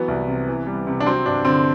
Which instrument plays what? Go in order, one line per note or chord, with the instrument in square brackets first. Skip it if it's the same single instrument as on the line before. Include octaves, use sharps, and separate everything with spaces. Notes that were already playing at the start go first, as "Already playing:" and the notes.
Already playing: [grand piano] E3 F#3 B3
C2
C3
E3
G3
C3
D4
F#3 C4
G2 D4
D3 C4